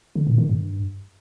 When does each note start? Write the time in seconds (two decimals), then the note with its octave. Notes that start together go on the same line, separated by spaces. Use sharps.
0.15 D3
0.27 A#2
0.38 D#3
0.49 G2